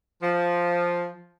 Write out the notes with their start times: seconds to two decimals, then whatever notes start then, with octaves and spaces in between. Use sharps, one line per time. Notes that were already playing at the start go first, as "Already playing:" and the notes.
0.22 F3